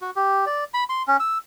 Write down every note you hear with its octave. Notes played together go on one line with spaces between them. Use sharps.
F#4
G4
D5
B5
C6
C#4
E6